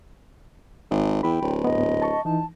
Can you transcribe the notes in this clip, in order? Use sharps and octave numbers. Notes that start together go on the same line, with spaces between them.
G#1
E2 G5 B5
D1
G#2 B3 D#5
A5 C#6
E3 D#4 A5